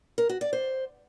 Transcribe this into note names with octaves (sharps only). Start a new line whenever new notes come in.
A#4
F#4
D5
C5